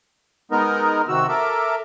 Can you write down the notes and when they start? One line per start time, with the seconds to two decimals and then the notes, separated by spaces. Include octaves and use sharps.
0.51 G#3 B3 D#4 A#4
1.08 C3 D#3 F#4 E6
1.29 A4 A#4 E5 D6